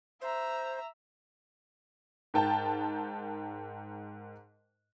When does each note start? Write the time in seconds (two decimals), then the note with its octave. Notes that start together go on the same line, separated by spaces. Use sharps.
0.21 C5 E5 A#5
2.34 G#2 A#4 G5 A5